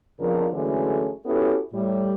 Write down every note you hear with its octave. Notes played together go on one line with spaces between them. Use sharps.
F2 C#3 F3 B3 D4 A#4
D3 E3 F#3 G#3 A3 C#4
B3 C#4 E4 F#4 G4 A4
A2 G3